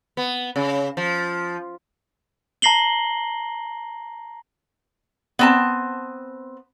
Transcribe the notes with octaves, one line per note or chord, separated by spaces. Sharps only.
B3
C#3
F3
A5 A#5 A#6 C7 F#7 G7
B3 C4 A5